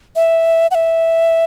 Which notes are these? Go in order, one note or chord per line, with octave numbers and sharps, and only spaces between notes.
E5
F#5
E5